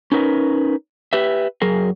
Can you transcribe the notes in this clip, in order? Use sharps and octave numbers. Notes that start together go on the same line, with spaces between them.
C#4 D#4 A#4 B4
G4 B4 E5
F#2 F#3 G#4 A#4